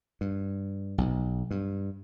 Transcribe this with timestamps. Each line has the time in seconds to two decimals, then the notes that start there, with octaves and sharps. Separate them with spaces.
0.21 G2
0.98 B1
1.51 G2